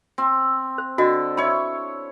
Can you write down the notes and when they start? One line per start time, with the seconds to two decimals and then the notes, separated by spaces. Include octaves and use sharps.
0.18 C4
0.78 C5
0.98 D3 F#4 D#5
1.37 E4 C#5 B5